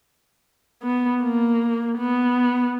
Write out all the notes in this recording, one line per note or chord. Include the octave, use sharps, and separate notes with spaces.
B3
A#3
B3